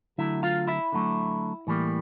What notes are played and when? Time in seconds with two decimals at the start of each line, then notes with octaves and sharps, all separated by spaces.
0.18 D3 F#3 A3 E4 E5
0.43 F4 F5
0.68 E4 E5
0.92 D3 F#3 A3
1.67 A2 E3 G3 A#3